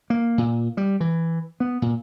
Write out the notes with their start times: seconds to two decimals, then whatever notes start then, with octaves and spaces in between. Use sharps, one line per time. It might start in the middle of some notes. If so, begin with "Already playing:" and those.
0.10 A#3
0.38 A#2
0.77 G3
1.00 E3
1.60 B3
1.82 A#2